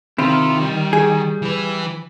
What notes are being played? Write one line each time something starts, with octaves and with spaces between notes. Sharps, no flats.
C3 D#3 E4 F4 G4
G3
G#4
E3 B4